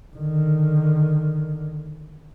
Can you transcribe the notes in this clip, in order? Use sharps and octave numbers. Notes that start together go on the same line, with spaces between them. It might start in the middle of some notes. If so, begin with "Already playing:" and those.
D3 D#3